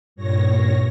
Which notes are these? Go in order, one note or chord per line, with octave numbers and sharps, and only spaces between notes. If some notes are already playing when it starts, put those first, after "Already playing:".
G2 A#2 C#5 A#6